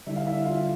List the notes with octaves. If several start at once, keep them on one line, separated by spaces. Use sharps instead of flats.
D3 G3 D4 E4 E5
F5
E4 E5
F4 F5